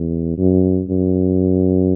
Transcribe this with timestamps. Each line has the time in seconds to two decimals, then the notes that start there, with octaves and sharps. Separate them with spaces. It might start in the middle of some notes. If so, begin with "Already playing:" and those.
Already playing: E2
0.38 F#2
0.89 F#2